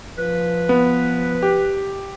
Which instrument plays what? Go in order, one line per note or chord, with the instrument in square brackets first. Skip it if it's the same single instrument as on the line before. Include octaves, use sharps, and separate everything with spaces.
[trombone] F3 [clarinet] B4
[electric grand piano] B3
G4